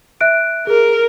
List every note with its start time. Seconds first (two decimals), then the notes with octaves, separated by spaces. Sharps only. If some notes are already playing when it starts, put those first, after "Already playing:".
0.21 E5 F#6 D7
0.67 G#4 A#4